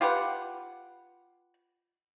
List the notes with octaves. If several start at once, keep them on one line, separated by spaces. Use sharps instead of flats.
F4 G4 B4 F#5